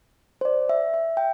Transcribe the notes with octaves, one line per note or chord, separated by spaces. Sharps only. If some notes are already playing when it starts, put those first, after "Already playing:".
C5
D5
E5
E5
G5